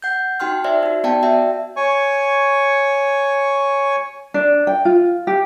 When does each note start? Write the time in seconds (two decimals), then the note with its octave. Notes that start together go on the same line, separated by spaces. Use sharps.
0.02 F#5 G6
0.40 D#4 F#4 G5 C6 F6
0.64 D#4 C5 D5 E5
0.83 D#4 F#4
1.04 B3 D5 F5 G5 A5
1.23 F#4 D5 E5 G5
1.76 C#5 G#5 C#6
4.34 D4
4.67 G5
4.85 F4
5.27 G4